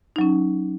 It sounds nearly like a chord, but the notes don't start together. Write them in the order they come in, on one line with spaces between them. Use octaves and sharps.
D#4 F#3 C#4